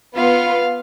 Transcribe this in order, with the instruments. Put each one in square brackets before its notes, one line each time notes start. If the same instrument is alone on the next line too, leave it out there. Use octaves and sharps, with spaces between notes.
[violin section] B3 F4 B4 [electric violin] F5